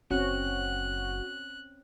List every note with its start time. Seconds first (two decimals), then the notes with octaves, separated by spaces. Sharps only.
0.11 F#1 C4 C#4 F#4 F#6